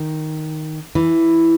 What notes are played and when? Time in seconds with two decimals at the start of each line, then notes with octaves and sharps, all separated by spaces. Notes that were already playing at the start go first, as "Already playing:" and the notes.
Already playing: D#3
0.95 E3